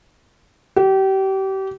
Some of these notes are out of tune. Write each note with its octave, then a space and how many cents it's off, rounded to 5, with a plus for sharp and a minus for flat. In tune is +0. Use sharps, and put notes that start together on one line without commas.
G4 -30